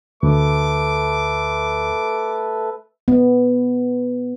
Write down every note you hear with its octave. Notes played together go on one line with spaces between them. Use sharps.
D2 A3 A4 B4 D6
B3